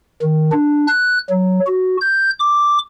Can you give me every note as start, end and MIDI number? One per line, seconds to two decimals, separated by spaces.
0.22 0.50 51
0.52 0.86 62
0.87 1.18 90
1.29 1.59 54
1.67 1.97 66
2.01 2.30 91
2.39 2.78 86